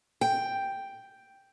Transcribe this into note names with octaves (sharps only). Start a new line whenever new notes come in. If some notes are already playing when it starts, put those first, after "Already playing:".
G5